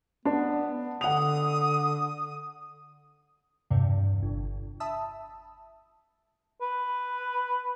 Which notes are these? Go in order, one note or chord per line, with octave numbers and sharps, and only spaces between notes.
B3 D4
D3 F#5 D#6 F7
E2 G2 C3
G1
E5 A5 B5 D#6 E6
B4